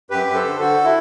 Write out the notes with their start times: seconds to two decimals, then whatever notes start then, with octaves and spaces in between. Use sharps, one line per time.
0.11 F#2 G4 B4
0.27 F#2
0.35 A4 C5
0.44 D3
0.59 D3 F#4 A4
0.84 E4